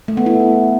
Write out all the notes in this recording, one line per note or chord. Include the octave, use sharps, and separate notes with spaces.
A3
B3
E4